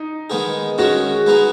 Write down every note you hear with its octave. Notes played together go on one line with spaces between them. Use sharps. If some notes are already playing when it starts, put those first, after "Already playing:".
Already playing: D#4
D#3 G#3 B3 G#4
D#3 G#3 C#4 F#4 G#4
G#3 B3 D#4 G#4